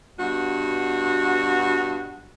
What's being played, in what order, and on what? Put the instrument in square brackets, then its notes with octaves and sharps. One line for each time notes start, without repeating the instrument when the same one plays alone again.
[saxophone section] G2 B2 F#4